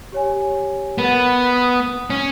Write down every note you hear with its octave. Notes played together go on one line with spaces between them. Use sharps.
G4 C#5 G#5
B3 A#4 F#5 A6
D#6
C#4